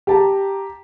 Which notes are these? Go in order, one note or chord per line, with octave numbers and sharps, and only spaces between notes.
G4 A5 A#5